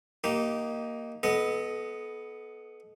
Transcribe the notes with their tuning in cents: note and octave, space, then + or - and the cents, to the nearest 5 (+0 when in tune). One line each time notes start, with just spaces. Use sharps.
A#3 +0 D#4 +0 G4 -25
B3 +0 A4 -30 D#5 +5